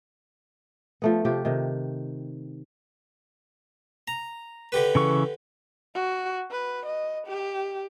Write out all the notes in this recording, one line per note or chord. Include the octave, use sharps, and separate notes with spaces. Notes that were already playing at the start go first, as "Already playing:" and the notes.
F3 A3 B3
C3 F3 F4 G4
C3 D#3
A#5
D3 G4 B4
C#3 E3 C#6
F#4
B4
D#5
G4